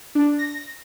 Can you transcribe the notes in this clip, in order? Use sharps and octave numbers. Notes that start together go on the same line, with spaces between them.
D4
A#6